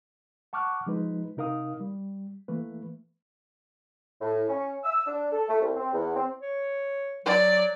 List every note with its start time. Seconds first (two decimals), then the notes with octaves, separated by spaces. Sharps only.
0.53 F#5 A5 C#6 D6 F6 F#6
0.86 F3 G#3 D#4 B4
1.37 C3 D#4 A#4 F5 D#6
1.80 G3
2.48 E3 A3 A#3 B4
4.21 A2
4.49 C#4
4.84 E6
5.06 D4
5.31 A4
5.48 A3
5.61 C2
5.76 C4
5.93 E2
6.15 C4
6.42 C#5
7.26 F#3 D5